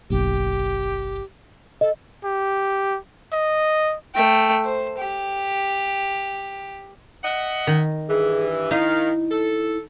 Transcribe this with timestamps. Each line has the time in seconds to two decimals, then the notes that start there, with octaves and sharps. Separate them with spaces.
0.10 F#1 B1 G4
1.81 A4 D#5
2.25 G4
3.33 D#5
4.15 A3 G5
4.65 C5
4.99 G4
7.24 D#5 E5 F#5
7.67 D#3
8.09 G2 E3 G#4
8.71 D#3 D#4 E4 F5
9.31 A4